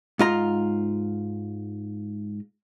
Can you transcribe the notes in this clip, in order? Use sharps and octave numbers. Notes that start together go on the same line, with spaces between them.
G#2 F4 A#5